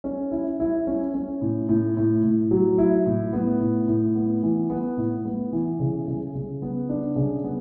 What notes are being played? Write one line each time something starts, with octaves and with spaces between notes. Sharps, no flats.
C#4
E4
E4
C#4
C#4
A2
A2
A2
A2
F#3
E4
A2
B3
A2
A2
B3
E3
B3
A2
B3
E3
C#3
C#3
C#3
B3
D4
C#3
B3